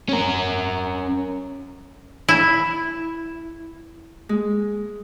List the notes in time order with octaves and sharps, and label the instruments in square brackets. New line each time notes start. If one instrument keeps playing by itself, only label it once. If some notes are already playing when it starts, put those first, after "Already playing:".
[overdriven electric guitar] C#4 A#4
[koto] E4
[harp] G#3